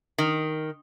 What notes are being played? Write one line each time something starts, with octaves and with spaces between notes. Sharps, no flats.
D#3